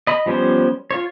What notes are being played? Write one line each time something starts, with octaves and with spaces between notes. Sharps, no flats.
D#5 B5
F3 G3 B3 C#4 C5
F4 C#5